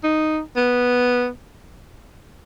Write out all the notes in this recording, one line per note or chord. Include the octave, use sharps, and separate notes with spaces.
D#4
B3